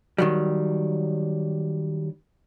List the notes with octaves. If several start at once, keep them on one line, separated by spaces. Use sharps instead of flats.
D#3 F#3 G3